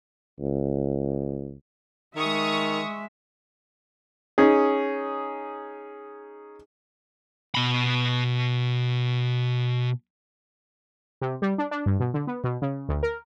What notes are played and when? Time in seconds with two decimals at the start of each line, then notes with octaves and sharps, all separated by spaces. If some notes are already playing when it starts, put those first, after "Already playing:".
0.40 C#2
2.16 D#3 G#3 E5 C#6 D#6
4.38 C#4 D#4 G#4
7.55 B2 B5
11.21 C3
11.42 G3
11.58 D4
11.71 D4
11.86 G2
12.00 B2
12.14 D3
12.27 B3
12.44 B2
12.62 C#3
12.89 D2
13.03 A#4